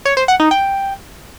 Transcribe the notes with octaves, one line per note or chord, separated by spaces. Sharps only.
C#5
C5
F#5
D#4
G5